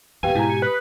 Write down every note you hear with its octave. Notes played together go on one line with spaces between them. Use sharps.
E2 A#2 G4 B4 F5 G5 G#5
G#2 B2 E4 G4 A#5
C#7
B4 B5 D#6